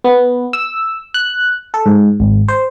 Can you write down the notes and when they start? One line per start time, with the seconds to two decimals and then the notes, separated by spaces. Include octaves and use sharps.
0.04 B3
0.53 E6
1.14 F#6
1.74 A4
1.86 G#2
2.20 G#1
2.48 C5